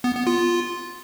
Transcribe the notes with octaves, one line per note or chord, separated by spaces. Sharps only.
B3
B3
F4